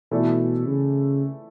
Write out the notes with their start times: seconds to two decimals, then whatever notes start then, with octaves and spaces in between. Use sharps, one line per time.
0.11 B2 E3 A3 E4 A4 D5
0.68 C#3